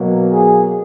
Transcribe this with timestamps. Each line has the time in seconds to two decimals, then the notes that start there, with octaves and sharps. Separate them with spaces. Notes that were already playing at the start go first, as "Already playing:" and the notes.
Already playing: B2 F#3 A#3
0.30 G#4